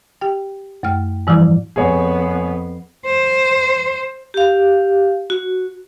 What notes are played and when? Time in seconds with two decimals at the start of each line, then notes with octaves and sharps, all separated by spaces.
0.21 G4 G5
0.83 F#2 A3 G5 F6
1.27 G#2 E3 F3 G3 E4
1.76 F2 B3 G#4 C#5
3.06 C5
4.34 G4 F5
5.30 F#4